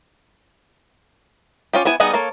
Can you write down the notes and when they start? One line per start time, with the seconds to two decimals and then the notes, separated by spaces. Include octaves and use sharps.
1.73 C#4 F4 G4
1.85 B3 E4 G#5
2.00 G3 B3 D#4 G#4 F#5
2.14 A#3 A4 C#5